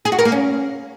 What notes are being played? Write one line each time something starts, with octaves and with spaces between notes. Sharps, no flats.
G#4
F#4
A#4
A#3
C#4